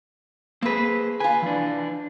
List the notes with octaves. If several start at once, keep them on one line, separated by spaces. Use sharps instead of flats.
A#3 C4 G#4 B4
F4 B4 G#5
E3 D4